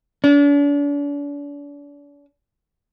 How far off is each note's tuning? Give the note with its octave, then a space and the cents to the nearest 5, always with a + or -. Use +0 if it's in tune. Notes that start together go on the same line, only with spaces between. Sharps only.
D4 -40